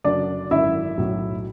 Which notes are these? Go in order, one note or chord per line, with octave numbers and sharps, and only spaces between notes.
F#1 F#2 D3 F#3 D4 D5
G#1 F#2 D3 E4 E5
B1 A2 F#3